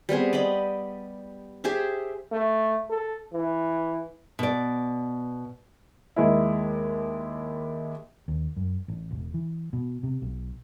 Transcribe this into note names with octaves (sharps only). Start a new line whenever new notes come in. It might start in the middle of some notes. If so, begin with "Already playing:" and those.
G3 B3 C4 G#4
D5 D#5 G5 B5
G4 G#4 C5 E5
A3
A4
E3
B2 D5
D#2 G#3 E4
D#2
F#2
A1
E1
E3
B2
C3
B1